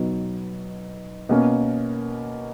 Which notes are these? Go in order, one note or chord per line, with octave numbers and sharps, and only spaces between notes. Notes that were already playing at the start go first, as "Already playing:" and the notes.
Already playing: B2 F#3 B3 D#4
B2 A#3 C#4